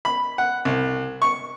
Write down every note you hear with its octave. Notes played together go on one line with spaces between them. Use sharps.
B5
F#5
C2
C#6